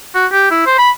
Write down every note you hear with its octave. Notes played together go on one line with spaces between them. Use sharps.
F#4
G4
E4
C5
B5